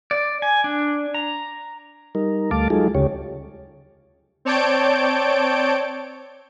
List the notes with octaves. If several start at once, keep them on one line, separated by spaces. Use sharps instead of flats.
D5
G#5
D4
A#5
G3 D#4 A#4
D2 G3 A3 F5 A5 D6
F#3 G#3 D#4 F4 G#4 A4
D2 C#3 G4 C#5
C4 C#5 D5 A5 G6 D7